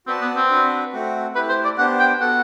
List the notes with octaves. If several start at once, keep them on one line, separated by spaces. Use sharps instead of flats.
C4 F#4 B4 D5 A5
B3
C4
D4 F#4 B4
A3 C4 F#4
A3 E4 G4 B4
C5
D5
B3 D4 G4 C5 F#5
G5
B3 F#4 A4 F#5